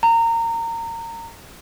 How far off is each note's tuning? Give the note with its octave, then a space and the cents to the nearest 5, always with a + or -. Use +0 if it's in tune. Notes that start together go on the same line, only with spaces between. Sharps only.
A#5 -25